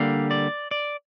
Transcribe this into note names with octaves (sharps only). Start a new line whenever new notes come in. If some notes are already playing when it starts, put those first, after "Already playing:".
Already playing: D3 G3 A#3 F5
D5
D5